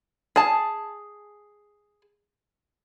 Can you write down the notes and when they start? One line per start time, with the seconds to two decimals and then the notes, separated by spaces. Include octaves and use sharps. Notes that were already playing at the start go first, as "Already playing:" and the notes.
0.36 G#4 A5